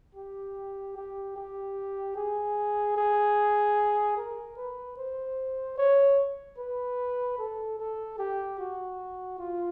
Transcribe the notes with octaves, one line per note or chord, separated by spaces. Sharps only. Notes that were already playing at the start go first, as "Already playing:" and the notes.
G4
G4
G4
G#4
G#4
A#4
B4
C5
C#5
B4
A4
A4
G4
F#4
F4